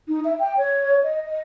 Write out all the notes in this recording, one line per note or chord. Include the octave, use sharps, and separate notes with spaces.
D#4
E5
G5
C#5
D#5
D#5